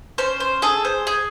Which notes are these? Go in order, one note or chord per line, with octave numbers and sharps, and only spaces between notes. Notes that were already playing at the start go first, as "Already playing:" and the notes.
C#4 C5
C5
G#4 A4
C5
G#4